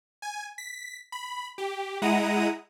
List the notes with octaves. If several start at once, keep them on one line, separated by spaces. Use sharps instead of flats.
G#5
B6
B5
G4
G#3 E4 F#5 A#5 D#6 D#7